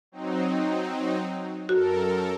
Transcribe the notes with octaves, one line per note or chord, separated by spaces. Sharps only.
F#3 C4 D#4
F#2 F#4 A4 A#4